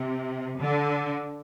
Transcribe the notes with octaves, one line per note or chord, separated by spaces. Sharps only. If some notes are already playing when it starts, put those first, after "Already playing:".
Already playing: C3
D3